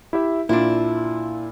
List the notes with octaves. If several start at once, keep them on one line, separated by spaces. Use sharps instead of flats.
E4 G4 E5
A#2 D4 E4 F4